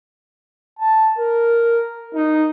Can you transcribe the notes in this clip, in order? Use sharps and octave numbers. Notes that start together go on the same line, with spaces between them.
A5
A#4
D#4